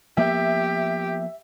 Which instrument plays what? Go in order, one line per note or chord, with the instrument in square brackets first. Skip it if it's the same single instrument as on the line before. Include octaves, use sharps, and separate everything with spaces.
[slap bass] F3 A#3 B3 [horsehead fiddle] G4 [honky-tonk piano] E5